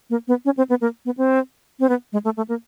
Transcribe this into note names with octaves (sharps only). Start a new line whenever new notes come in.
A#3
B3
C#4
C4
B3
A#3
B3
C4
C4
B3
G#3
A3
A3
A#3